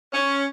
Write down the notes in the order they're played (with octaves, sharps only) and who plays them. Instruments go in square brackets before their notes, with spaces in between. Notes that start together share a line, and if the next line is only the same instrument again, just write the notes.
[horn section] C#4